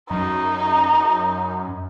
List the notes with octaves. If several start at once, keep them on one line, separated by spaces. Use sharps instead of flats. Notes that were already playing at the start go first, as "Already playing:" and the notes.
F#2 D#4